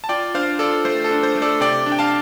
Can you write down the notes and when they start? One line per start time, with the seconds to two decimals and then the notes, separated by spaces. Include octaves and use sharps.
0.04 A5
0.09 F4 D5 G5
0.34 D4 C5 F5
0.59 F4 A4 D5
0.85 A3 C5
1.04 A4
1.11 D4
1.23 C5
1.35 A3
1.42 A4 D5
1.60 C3 D5 G5
1.86 D4
1.92 G5
1.99 F5 A5